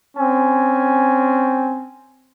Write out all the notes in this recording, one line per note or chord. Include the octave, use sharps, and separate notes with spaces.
C4 C#4 G#5